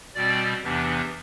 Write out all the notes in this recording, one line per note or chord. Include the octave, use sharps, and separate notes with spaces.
B2 G3 C4 D5
E2 C3 E3 B3 D4